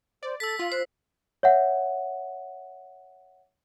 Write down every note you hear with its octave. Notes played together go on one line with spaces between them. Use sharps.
C5 D5
A4 E6 A6 B6
F4 F5
C5 F#6
C#5 E5 F#5